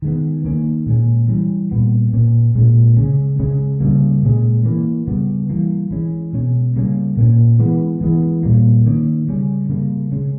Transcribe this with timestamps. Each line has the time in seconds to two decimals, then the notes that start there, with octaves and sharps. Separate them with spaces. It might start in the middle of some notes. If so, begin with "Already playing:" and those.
0.02 D#3 G#3 B3
0.45 D#3 A#3 C#4
0.86 A#2 G#3 C#4
1.28 E3 G3 C#4
1.71 A#2 G3 B3
2.13 A#2 A#3 C#4
2.55 A#2 G#3 C#4
2.97 C#3 G#3 C#4
3.39 C#3 G#3 C#4
3.80 C#3 G3 A#3
4.22 A#2 G#3 C#4
4.65 E3 A#3 C#4
5.08 C#3 G3 B3
5.49 E3 G3 A#3
5.91 E3 G#3 C#4
6.33 B2 G#3 C#4
6.75 C#3 G3 A#3 C#4
7.17 A#2 A#3 C#4
7.59 E3 G#3 B3
8.01 E3 G#3 B3
8.43 A#2 G3 A#3
8.86 D#3 A#3 C#4
9.28 C#3 G3 C#4
9.69 C#3 G3 A#3
10.12 C#3 G#3 C#4